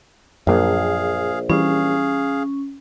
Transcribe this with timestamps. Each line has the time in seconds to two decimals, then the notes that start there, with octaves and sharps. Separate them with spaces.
0.47 A#1 F#2 A#3 G#4 F5
1.50 E3 G3 C#4 G#4 F5